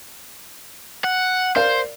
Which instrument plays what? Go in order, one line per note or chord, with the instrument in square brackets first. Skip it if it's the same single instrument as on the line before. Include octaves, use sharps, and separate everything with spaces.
[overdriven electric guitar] F#5
[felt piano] A#4 D5 F5 [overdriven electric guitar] C5